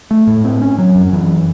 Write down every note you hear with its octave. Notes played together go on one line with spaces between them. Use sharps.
A3
A2
C4
C#4
F#3
F#2
E3